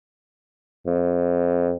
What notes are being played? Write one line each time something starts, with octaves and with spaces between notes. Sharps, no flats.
F2